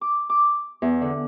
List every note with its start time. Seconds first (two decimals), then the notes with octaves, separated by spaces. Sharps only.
0.01 D6
0.30 D6
0.82 E2
1.01 D3